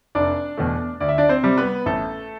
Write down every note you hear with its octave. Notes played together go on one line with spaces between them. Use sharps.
F1 D4 D5
E2 B2 A3
D2 D5
E5
D4 D5
C4 C5
C3 G3
B3 B4
A1 A3 A4